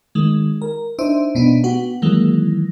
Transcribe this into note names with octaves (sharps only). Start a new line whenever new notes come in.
D#3 G#3
A#4
D4 D#4 C5 E5
B2 B3 D4 D#4
B3 F#4 G4
D#3 E3 F#3 G#3 A#3